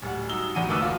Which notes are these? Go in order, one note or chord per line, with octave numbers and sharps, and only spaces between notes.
D1 G3 F#5
F#3 D#4 E6 G7
A1 E2 D4 F#4 F#5 D#7
G#1 D#3 A3 B4 D6 E6
F3 F4 F#4